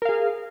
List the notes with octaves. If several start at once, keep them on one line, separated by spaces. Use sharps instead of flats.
G#4 A#4 F5